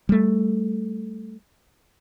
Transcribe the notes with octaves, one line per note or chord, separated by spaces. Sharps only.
G3 A3